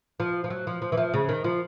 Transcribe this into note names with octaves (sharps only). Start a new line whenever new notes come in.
F3
F3
F#3
F3
F3
E3
F3
C#3
D#3
F3